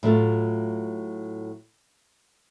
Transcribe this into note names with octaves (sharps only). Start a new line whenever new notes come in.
A2 F#3 A3 F4